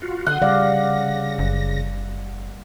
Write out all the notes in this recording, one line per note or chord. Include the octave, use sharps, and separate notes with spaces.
F4 F#4
D3 F#5 C6 D#6
C#3 G3 D5 F5 A#6
F#1